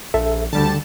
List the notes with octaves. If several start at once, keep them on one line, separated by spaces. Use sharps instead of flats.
A#1 A4 E5
D2 D3 G3 A5